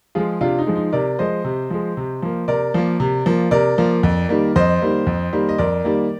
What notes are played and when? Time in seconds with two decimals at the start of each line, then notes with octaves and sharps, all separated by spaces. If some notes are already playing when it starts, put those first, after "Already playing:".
0.15 F3 G#3 F4 G#4
0.41 C3 D4 F4
0.59 D#4
0.67 F3 G#3
0.76 D#4
0.92 C3 A#4 D5
1.19 F3 G#3 C5 D#5
1.44 C3
1.70 F3 G#3
1.97 C3
2.22 F3 A#3
2.48 C3 A#4 D5
2.74 F3 A#3
3.00 C3
3.26 F3 A#3
3.51 C3 A#4 D5
3.78 F3 A#3
4.03 F2
4.29 D#3 G3 A#3
4.56 F2 C5 D#5
4.82 D#3 G3 A#3
5.07 F2
5.33 D#3 G3 A#3
5.49 D#5
5.58 F2 A#4 D5
5.84 D#3 G3 A#3